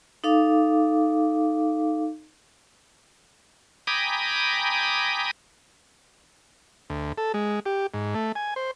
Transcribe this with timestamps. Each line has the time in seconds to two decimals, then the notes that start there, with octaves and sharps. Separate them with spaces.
0.24 D#4 A4 F5 D6
3.87 G5 G#5 A#5 B5 D6 D#6
6.90 D2
7.18 A4
7.34 G#3
7.66 G4
7.94 G#2
8.15 A3
8.35 G#5
8.56 C5